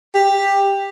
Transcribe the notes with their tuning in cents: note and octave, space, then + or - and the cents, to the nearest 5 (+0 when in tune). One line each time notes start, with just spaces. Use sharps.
G4 +10